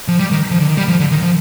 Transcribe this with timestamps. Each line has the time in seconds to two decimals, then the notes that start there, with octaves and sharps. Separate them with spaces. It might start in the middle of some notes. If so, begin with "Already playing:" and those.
0.08 F3
0.20 G3
0.31 D#3
0.51 F3
0.60 D3
0.69 D#3
0.77 G3
0.88 F3
1.00 D3
1.11 D#3
1.22 F3